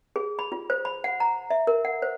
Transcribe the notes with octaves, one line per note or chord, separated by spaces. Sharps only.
G#4
B5
F4
C5
B5
F#5
A#5
E5
A#4
F#5
C5